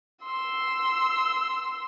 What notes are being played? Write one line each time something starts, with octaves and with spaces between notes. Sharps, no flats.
C6 E6